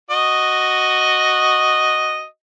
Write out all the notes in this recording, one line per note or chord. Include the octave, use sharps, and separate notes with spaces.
F#4 D#5